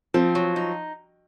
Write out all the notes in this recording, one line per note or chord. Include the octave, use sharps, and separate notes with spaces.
F3 C4
F#3
D#4